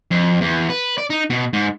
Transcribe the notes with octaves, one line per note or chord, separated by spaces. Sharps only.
F2
E2
B4
D5
D#4
B2
G#2